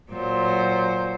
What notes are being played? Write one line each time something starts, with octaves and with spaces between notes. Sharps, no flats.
A#2 F#3 C5